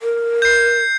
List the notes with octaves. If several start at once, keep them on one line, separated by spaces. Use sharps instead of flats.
A#4
G6 C7